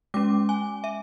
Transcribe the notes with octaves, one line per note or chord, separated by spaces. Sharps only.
G#3 C#4 D6
G#5
E5